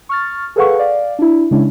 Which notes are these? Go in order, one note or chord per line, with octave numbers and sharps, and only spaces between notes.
C#6 F6 A6
G#4 A4 B4 F5 F#5 C#6
D5 F5
D4 E4
C#3 G#3 C#4 D4 E4